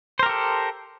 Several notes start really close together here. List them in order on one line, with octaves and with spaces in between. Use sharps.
C5 A#4 G4 A4